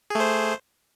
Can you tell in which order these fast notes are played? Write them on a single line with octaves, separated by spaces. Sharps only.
G#4 A3 C5